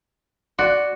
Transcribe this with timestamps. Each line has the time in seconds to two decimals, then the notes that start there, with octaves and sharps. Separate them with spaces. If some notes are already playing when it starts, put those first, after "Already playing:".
0.59 F#4 D5 C6